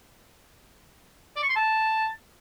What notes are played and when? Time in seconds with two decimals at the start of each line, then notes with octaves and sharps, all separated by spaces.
1.36 D5
1.43 C#6
1.49 C6
1.56 A5